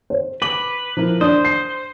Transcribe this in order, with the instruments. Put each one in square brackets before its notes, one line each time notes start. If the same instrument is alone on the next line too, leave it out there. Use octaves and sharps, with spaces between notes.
[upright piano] C5
[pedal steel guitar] B4 [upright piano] D6 F#7
[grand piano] F3 E4 A#4
[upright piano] D4 [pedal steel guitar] C5 [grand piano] D#6
[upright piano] C7